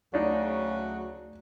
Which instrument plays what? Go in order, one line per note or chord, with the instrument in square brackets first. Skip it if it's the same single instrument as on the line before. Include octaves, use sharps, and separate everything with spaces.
[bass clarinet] D2 [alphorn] C#3 [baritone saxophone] F#3 [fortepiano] D4 D#4